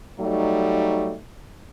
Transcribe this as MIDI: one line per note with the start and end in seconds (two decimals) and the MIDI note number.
0.20 1.13 54
0.20 1.13 55
0.20 1.13 57
0.20 1.13 63